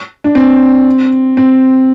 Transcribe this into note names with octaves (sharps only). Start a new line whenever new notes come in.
D4
C4
C4